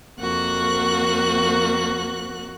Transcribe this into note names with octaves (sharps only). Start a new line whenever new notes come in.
F2 A#3 F#4 F#6